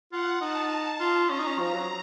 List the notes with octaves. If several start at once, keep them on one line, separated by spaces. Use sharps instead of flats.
F4 F#5
D#4 A5
F4
C#4 A#5
D#4
C#4
F3 A#5
F#3